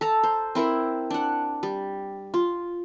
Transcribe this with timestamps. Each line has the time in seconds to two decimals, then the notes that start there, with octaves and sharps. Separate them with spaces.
0.01 A4 A5 A#5
0.23 C5
0.55 C4 E4 A#4 C5
1.10 D4 F#5
1.63 G3
2.34 F4